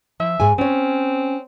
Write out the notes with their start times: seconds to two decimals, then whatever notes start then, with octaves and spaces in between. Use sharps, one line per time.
0.20 F3 E5
0.40 G#2 G#4 G#5
0.58 C4 C#4 C#5